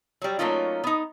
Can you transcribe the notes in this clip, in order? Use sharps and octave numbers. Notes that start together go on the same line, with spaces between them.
F#3 G3
F#3 A3 A#3 C#4 D#4 F4
B3 D#4